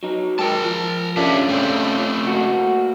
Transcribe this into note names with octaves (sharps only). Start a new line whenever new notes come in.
F#3 D#4
G#2 G4 A#4 A5
F3
C#4 D4 F4 G4 A4 E5
A3 C4 C5
A#3 F#4